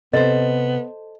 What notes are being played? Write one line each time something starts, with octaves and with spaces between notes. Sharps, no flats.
C3 B3 A4 C5 D#5